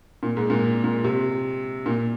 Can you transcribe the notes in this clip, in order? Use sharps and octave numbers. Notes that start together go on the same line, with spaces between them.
A#2
G#2
A#2
A#2
C3
A#2